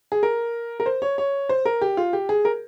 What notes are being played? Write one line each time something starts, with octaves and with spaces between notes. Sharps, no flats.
G#4
A#4
A#4
C5
C#5
C#5
C5
A#4
G4
F4
G4
G#4
A#4